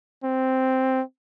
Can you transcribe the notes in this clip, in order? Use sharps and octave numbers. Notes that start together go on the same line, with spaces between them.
C4